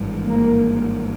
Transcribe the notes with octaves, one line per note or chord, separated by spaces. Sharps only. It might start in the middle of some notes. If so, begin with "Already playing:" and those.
Already playing: G#1 G2 E3 G#3
A#3